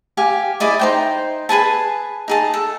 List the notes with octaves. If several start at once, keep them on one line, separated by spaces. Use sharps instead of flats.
G4 F5 G#5
E4 G#4 D5 D#5
D#4 C5 G5
G#4 B4 G#5 A5
D#4 G#4 A5
A4